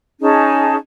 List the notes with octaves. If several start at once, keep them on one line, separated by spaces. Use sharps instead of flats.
C#4 D#4 G#4 A5